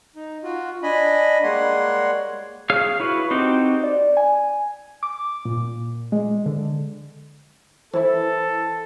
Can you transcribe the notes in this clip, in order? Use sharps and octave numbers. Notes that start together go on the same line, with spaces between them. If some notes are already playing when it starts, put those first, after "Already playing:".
D#4
F4 F#4
D4 D#5 G#5 B5
G3 G#3 A#3 C#5 F#5 C6
G#4 C#5 F5 F6
E4 F#4 B4
C4 D#4 F#4 G4
D5
G#5
D6
A#2
G#3
D3
E3 E4 A4 C5